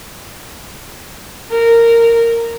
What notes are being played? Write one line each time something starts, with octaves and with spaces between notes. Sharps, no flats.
A#4